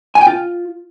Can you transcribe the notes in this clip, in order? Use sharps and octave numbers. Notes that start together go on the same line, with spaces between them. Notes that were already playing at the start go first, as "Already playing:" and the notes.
G#5
G5
F4